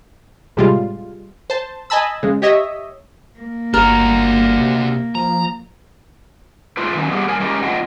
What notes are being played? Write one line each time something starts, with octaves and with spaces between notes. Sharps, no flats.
A2 C3 G3 G#3 F4
C5 A5
D#5 G#5 A5 B5 E6
C#3 G#3
G4 C#5 D#5 E5
A#3
G1 D4 F#4 A#4
C3
F3 A#5
G#2 A3 F4 B4
D#3 F#3 C4 C#4
G3 B3 D4 G4 G#4 C#5
G2 A#4 G#5
G#3 C#4 G4 G#4 A#4
C4 D4 F4 D#5 F#5 G5